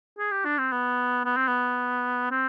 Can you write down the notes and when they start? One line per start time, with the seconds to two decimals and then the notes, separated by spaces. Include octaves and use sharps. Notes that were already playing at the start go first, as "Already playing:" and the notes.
0.19 G#4
0.31 G4
0.45 D4
0.58 C4
0.72 B3
1.25 B3
1.36 C4
1.48 B3
2.31 C4